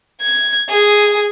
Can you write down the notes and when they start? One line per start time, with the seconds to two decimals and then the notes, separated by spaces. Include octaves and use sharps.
0.22 G#6
0.70 G#4